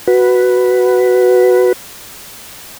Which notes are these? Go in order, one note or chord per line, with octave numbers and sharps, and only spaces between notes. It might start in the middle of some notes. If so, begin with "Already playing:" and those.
F#4 B4